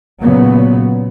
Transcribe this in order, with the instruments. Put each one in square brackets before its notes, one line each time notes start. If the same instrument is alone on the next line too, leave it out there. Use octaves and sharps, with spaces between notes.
[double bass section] A#2 C#3 F#3 B3